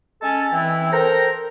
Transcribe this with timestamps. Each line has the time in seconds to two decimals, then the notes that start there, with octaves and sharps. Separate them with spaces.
0.22 G#3 C#4 A4 G#5 A5
0.52 E3 C4 E4
0.92 A4 A#4 C5 G5 A#5